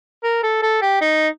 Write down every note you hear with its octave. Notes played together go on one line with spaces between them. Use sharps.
A#4
A4
A4
G4
D#4